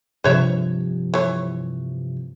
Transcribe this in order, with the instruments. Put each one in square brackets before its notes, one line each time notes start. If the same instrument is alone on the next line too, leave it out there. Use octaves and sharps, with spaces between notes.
[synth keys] G2 C3 F3 [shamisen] B4 C#5 E5
[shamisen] E3 C#5